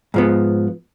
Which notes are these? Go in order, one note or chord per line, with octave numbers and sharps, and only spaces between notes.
G#2 F3 B3